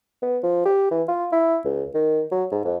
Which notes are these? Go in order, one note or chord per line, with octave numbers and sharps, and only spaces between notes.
B3
F3
G4
E3
F4
E4
C#2
D#3
F#3
G#2
F2